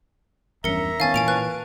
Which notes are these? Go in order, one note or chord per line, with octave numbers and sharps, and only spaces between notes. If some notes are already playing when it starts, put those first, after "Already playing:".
E2 G2 C#4 A#4 E5 A#5 C#7
D#3 B3 C#4 F5 G#5 A5 A6
A#2 E3 G#5 D7 F7
B4 F#6